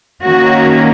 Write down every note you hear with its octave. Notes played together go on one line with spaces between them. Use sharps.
D#3 A#3 C#4 F#4